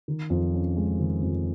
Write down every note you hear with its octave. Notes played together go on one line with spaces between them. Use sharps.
D#3
F2
C#4
G#3
D#3
F2